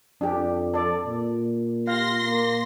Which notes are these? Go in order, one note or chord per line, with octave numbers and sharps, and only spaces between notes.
F2 D4 G4
A4 D5
A#2
F4 G4 F5 C6 A#6
A#3